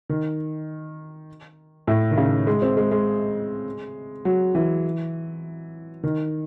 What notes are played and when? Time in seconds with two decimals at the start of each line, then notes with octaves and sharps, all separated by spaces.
0.10 D#3
1.87 A2
2.11 D#3
2.17 C#3
2.47 G#3
2.62 C4
2.77 G#3
2.91 G#3
4.25 F#3
4.55 E3
6.04 D#3